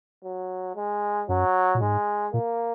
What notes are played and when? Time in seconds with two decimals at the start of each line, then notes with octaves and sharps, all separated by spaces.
0.24 F#3
0.76 G#3
1.29 F#2 F#3
1.75 A#2
1.81 G#2 G#3
2.33 A#2 A#3